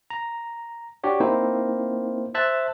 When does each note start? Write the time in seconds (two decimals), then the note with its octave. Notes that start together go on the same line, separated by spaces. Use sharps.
0.10 A#5
1.04 D4 F#4 G4 C#5
1.20 A#3 C4 D#4 E4 C5
2.35 C5 E5 A5 F#6 A6